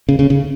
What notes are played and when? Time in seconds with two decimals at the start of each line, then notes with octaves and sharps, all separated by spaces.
0.09 C#3
0.19 C#3
0.30 C#3